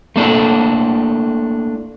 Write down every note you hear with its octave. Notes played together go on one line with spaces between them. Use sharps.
A3 A#3 D4 E4 A4